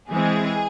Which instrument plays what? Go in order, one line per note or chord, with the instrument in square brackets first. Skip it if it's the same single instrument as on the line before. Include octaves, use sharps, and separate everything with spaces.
[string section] E3 G#3 C4 G#4